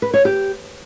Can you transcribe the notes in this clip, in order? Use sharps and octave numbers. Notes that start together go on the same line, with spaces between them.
B4
C#5
G4